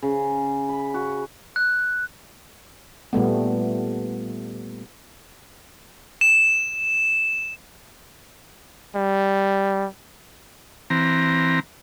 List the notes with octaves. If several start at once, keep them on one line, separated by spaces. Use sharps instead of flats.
C#3
B5
F#4
F#6
A#2 G3 A3 B3
E7
G3
E3 C4 A#5